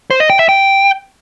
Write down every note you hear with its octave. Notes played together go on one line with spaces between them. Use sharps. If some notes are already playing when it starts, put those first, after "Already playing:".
C5
D#5
G5
E5
G5